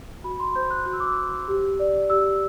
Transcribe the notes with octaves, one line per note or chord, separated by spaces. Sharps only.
F#4 B5
C6
C5 G6
F#6
F#4 F#6
E6
D6
E6
C5
G4
D5
G4 E6